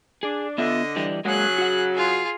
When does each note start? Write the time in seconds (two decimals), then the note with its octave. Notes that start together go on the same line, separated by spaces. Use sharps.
0.23 D4 G#4
0.58 D3 B3 F4 D#5 E5
0.96 E3 G3 D4
1.25 C#3 F#3 G#3 A#3 F#4 G#4 F#6
1.58 F#4 F#5
1.95 F4 G#4